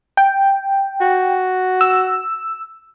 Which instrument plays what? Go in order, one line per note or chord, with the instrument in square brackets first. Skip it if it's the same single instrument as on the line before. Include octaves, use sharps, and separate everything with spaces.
[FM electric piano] G5
[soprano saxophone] F#4
[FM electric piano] E6